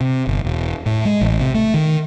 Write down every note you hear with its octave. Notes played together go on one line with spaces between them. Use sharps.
C3
G1
E1
A2
G#3
A1
C3
A3
D#3